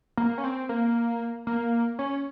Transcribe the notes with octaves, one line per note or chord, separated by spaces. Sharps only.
A#3
C#4
C4
A#3
A#3
C#4